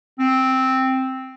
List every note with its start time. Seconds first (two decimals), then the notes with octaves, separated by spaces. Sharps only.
0.19 C4